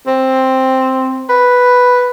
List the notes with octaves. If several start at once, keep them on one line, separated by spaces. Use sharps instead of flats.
C4
B4